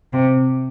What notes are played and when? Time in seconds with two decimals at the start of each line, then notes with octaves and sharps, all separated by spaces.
0.13 C3